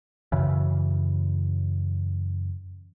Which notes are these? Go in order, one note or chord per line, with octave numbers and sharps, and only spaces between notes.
F#2 C#3 E3